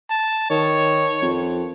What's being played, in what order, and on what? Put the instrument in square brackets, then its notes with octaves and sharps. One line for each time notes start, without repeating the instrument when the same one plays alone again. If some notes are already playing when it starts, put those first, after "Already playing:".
[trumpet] A5
[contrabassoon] D#3 [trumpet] C#5
[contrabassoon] F2